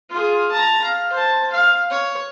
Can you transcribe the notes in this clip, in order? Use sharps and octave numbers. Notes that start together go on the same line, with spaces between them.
F4 G#4
A5 A#5
F5
C5 A5
F5
C#5